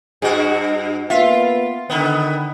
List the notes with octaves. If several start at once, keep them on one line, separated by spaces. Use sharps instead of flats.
G2 F#4 G#4
A#3 B3 F4 B4 E5 F5
D3 D#3 B3